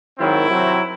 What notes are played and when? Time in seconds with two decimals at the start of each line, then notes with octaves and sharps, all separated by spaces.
0.18 G#2 D#3 F#3 C4 E4
0.50 C3 F#3 C4